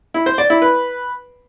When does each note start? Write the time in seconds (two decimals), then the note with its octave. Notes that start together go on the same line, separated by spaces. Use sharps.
0.14 E4
0.26 C5
0.38 D5
0.50 E4
0.62 B4